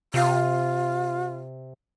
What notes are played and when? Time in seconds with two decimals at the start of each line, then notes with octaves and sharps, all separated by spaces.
0.14 C3 F4